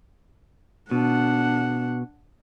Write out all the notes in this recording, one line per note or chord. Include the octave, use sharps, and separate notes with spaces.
B2 D4 F#5